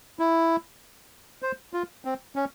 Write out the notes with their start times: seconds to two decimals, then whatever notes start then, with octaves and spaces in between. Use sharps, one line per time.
0.19 E4
1.42 C5
1.73 F4
2.05 C4
2.36 C#4